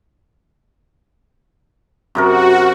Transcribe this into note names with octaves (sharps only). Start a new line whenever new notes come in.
F#2 C3 F#4 A#4